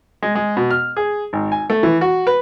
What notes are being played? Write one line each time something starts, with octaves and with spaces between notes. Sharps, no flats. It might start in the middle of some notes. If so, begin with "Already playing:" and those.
G#3
G#3
B2
F6
G#4
G#1
G#5
A3
E3
F#4
B4